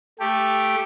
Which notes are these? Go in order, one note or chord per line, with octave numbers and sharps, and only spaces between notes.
A3 G4